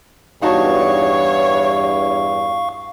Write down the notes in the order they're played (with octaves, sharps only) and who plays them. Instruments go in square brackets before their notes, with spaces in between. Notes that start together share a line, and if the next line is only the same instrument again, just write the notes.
[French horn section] E2 G2 [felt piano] D#4 F#4 A5 [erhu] C#5 [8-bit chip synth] F5 C#6